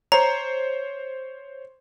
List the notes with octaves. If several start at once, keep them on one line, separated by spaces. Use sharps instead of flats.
C5 C#5 A#5